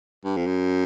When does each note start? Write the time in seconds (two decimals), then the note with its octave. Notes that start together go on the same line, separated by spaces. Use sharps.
0.25 G2
0.37 F2
0.46 F#2